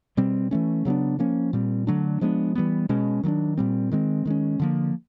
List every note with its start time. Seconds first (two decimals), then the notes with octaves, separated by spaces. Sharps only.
0.17 B2 G3 C4
0.51 E3 A3 C#4
0.85 C#3 F#3 B3 D4
1.19 F3 A#3 C#4
1.53 A#2 G3 C4
1.87 D3 F#3 A3 D4
2.21 F3 G#3 B3 D4
2.55 E3 G3 B3
2.89 B2 G#3 C#4
3.23 D#3 F#3 A3 D4
3.57 A#2 G3 C4
3.91 D#3 G#3 C4
4.25 D#3 G#3 C#4
4.60 D3 F3 A#3